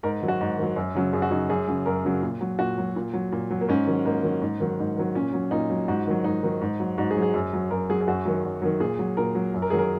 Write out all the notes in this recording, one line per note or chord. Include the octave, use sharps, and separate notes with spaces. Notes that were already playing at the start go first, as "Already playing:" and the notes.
G#2 A#4
D#3 F#3
F#4
G#2
D#3 F#3
F#2
C#3 F#3
F#2 G#4
F#4
C#3 F#3 D#4
F#2 G#4
C#3 F#3
F#2 A#4
C#3 F#3
A#2
F#3
A#2 F#4
F#3
A#2
F#3
A#2
F#3
A#3
G#2 C#4
D#3 F#3
G#2 A#3
D#3 F#3
G#2
D#3 F#3
G#2
D#3 F#3
A#2 C#4
F#3
A#2 D#4
F#3
G#2 F#4
D#3 F#3
G#2 D#4
D#3 F#3
G#2
F#3
G#2 F#4
G#4
F#3
G#4
F#2
F#3
F#2 A#4
F#3 G#4
G#4
F#2 F#4
D#3 F#3
F#2
D#3 F#3
A#2 G#4
F#3
A#2 A#4
F#3
F#2
A#4
D#3 F#3 G#4
A#4